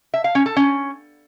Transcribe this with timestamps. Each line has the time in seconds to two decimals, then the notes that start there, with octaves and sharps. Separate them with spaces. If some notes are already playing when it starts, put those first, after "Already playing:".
0.14 E5
0.24 F5
0.35 C#4
0.46 A4
0.56 C#4